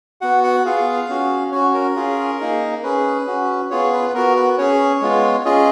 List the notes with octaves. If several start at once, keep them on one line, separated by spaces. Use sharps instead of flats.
B3 F#4 F#5
F#5
B3 F4 G#4 F5
C#4 F#4
C#4 F#4 C#5
A#4
C#4 F4 G#4
A#3 D#4 G#4
C#4 G#4 B4
C#4 F#4
B3 F4 G#4 C#5
B4
B3 F#4 A#4
B4
C#4 G#4 C#5
G#3 B3 F4
C#4 F4 G#4 D#5